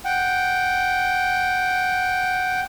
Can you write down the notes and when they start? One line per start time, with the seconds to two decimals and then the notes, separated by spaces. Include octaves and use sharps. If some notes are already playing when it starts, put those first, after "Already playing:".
0.05 F#5 G5